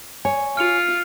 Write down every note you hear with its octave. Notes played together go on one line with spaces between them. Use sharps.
C#5 G#5
F4 F6 C#7 F7